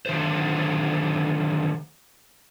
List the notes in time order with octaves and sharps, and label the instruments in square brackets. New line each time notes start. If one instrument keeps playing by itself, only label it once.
[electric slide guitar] D3 D#3 F#3 C5